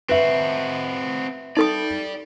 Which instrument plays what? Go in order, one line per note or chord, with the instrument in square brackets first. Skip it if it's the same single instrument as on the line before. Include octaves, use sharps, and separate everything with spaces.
[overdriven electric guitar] C4 F#4 [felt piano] B4 E5
[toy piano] D#4 A4 D#6 [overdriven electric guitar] D5 G5